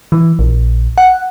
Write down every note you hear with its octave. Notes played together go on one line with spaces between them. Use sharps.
E3
A#1
F#5